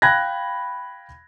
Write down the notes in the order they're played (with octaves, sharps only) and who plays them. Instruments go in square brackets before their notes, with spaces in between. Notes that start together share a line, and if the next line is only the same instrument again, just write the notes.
[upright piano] F5 G5 B5 F#6 G#6 A#6